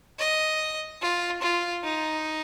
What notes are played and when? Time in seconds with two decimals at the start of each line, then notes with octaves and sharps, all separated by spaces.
0.19 D#5
1.01 F4
1.42 F4
1.83 D#4